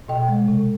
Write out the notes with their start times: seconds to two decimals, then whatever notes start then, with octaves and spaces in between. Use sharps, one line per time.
0.08 B2 D#5 G5
0.28 G#3
0.48 C3